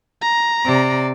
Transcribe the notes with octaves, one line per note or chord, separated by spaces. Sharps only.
A#5
C3 D5